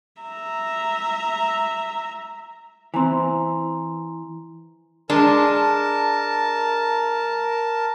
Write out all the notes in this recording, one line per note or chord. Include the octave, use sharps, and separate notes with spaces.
E5 A#5
E3 C4 G#5 A#5 C6
G#3 D4 A#4 A5